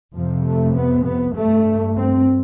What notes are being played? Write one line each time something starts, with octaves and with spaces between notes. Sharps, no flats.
F2 C3 F3
A3
B3
B3
G2 A3
C4